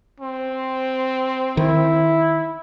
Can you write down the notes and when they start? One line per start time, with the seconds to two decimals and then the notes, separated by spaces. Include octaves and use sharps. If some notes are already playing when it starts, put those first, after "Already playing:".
0.20 C4
1.57 D#3 E4